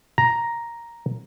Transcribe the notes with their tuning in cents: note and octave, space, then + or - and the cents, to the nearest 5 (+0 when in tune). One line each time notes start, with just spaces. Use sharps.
A#5 +5